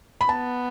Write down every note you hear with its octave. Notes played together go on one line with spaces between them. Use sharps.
B5
B3 A5